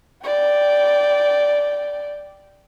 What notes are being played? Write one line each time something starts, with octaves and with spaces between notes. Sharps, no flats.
D5 G5